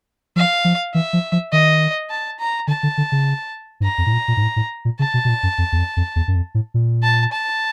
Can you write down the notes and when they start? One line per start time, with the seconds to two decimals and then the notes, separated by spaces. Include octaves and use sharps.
0.36 F3 F5
0.65 F3
0.94 E3 E5
1.13 F3
1.32 F3
1.52 D#3 D#5
2.10 A5
2.39 A#5
2.67 D3 A5
2.83 D3
2.98 D3
3.12 C#3
3.80 G#2
3.83 G2 A#5
3.98 F2
4.06 A2
4.13 A#2
4.28 A#2
4.37 G#2
4.42 A2
4.56 A2
4.85 A#2
4.99 C#3 A5
5.14 B2
5.25 B2
5.29 A#2
5.43 F#2
5.58 F2
5.72 E2
5.77 F2
5.97 F2
6.16 E2
6.28 F#2
6.36 F2
6.55 A2
6.74 A#2
7.03 A5
7.32 A5